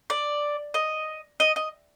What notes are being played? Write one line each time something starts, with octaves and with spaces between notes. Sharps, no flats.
D5
D#5
D#5
D#5